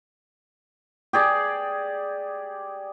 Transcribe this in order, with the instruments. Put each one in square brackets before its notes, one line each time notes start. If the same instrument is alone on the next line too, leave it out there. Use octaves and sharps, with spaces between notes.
[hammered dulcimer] G4 G#4 D5